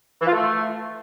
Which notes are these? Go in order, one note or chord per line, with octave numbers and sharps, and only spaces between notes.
E3
F4
A3